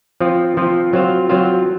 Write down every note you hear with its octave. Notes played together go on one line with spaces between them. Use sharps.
F3 C4 F4
F3 C4 F4
F#3 C4 F4 C5 F5
F#3 C4 F4 C5 F5